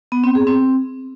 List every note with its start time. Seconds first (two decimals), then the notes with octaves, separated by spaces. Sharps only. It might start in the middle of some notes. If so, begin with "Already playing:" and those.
0.12 B3
0.24 C4
0.35 G#4
0.47 C4